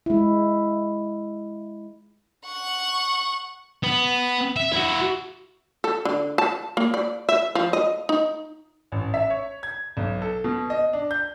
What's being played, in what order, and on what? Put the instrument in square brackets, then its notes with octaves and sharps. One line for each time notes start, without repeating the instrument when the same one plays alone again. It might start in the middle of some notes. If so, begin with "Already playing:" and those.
[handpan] G#3 E4
[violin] F#5 C#6
[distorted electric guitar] B3
E5
E4 F#4
[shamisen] A4
D3
A5
A#3
D5
E5
F3
D#5
D#4
[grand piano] A1
E5
C#5
G#6
B1
A4
B2
D#5
D4
G6